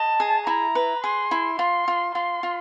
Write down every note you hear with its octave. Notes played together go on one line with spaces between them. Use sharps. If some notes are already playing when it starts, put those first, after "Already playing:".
Already playing: D#5 A5
G#4
E4 A#5
B4
G#4 C6
E4
F4 C6
F4
F4 C6
F4